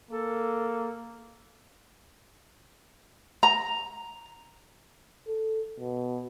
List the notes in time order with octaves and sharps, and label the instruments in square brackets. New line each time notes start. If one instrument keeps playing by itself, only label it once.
[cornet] A#3 [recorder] A4
[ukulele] A#5
[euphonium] A4
B2